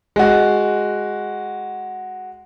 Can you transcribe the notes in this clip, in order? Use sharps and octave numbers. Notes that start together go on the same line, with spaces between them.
G#3 F#4